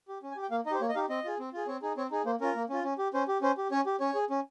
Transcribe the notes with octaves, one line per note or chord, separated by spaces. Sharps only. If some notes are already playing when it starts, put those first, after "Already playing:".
G4
C#4
G#5
G4
G5
A#3 F5
D#4 D#5
G4 C5
A#3 C#5
D#5
D#4 G4 F5
C4 D#5
F4 G#4
C4
F4 G#4
C4 C#5
D#4 G#4
C4 C#5
D#4 G#4
A#3 C5
C#4 F4 A#4
A#3
C#4 F4
C#4
G4
C#4 C5
G4
C#4 C5
G4
C#4 C#5
G4
C#4 C#5
G#4
C#4